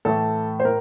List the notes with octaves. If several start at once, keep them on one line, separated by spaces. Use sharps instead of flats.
A2 E3 A3 A4
C5
A2 A#4